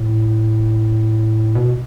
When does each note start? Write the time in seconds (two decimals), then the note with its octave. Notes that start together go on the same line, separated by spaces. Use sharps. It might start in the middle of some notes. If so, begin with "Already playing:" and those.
Already playing: A2
1.55 B2